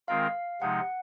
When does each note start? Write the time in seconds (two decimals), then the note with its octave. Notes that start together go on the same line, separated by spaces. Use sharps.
0.08 D#3 G#3 C4 F4 A#4 F5
0.61 C3 F3 G#3 D#4 F#5